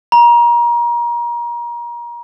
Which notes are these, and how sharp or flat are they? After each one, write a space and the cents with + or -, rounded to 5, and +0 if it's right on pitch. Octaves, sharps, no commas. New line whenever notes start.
A#5 +30